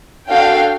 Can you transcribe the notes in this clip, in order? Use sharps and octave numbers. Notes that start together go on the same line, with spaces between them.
D4 F#4 A4 F5 G5